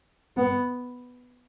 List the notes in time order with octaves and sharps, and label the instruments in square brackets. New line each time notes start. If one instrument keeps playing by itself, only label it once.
[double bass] B3